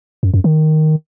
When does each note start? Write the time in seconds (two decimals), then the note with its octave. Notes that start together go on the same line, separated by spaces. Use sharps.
0.23 F#2
0.34 F#2
0.44 D#3